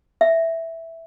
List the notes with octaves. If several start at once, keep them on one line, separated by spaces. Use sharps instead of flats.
E5